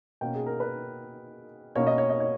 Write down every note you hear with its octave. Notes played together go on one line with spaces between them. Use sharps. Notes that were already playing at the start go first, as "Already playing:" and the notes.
B2 A#3 C#4 G5
G#4
A#4
B4
B2 A#3 C#4 C#5
D#5
C#5
D#5
C#5